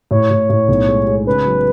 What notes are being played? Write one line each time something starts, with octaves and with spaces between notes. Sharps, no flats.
A2 C#5
A2
A2
B1
G#3
G#3
C#3 B4
F#3